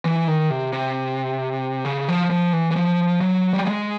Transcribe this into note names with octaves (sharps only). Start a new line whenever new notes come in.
E3
D#3
C3
C3
C#3
F3
F3
E3
E3
F3
F#3
G3
G#3